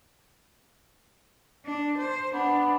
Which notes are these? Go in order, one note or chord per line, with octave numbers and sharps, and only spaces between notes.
D4
C5
B3 D4